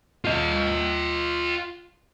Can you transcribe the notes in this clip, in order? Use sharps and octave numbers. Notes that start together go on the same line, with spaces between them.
F4 D#5